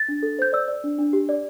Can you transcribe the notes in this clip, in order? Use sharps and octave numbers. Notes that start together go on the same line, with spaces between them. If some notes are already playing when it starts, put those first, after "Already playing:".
Already playing: A6
D4
A4
C5 G6
D5 E6
D5
D4
D4
G4
D5